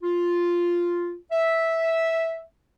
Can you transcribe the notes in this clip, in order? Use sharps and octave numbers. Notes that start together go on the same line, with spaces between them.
F4
E5